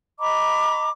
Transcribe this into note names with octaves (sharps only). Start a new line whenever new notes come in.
D#5 A#5 B5 D6